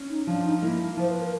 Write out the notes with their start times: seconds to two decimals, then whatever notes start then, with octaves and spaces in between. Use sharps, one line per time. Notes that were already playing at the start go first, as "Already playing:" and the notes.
Already playing: C#4
0.09 D#4
0.27 F3 D4
0.45 D#4
0.62 A#3 E4
0.97 F3 C5
1.09 B4
1.20 A#4